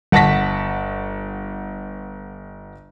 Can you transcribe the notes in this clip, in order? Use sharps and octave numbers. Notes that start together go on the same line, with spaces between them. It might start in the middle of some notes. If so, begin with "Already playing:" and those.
G1 F#5 A5 C#6 A#6 B6